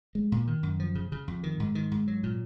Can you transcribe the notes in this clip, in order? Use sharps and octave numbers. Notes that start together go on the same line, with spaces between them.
G#3
A#2
D#3
F#2
F3
C#3
C#3
F2
D#3
G#2
D#3
G#2
F#3
A#2